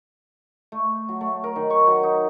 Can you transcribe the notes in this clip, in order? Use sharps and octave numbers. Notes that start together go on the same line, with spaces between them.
A3
F#3
A3
A#4
D#3
C#6
F#3
D#4